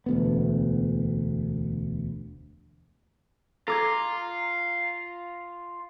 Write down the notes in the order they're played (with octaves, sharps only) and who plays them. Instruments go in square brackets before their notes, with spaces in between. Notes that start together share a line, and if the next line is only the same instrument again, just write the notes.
[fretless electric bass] E1 D2 B3
[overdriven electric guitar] F4 [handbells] A4 D6 G#6 [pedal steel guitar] A#5